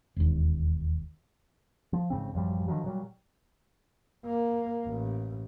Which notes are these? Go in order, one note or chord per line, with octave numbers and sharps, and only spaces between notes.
E1 D#2
F3
A1 G#2 C#3 C4
A1 F#2 F3 G3
D3 D#3 F3 F#3
A#2 F#3 G3
A#3
A1